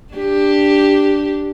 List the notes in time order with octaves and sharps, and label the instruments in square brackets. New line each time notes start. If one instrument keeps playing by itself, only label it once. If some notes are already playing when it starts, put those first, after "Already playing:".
[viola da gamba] D4 G4